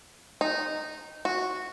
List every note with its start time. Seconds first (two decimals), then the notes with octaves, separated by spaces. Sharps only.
0.41 D#4
1.25 F#4